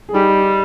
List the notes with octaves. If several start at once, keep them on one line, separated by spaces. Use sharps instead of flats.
G#4
G3 D#4 G4